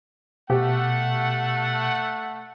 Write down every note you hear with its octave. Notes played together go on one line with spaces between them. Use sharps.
B2 A3 G4 F#5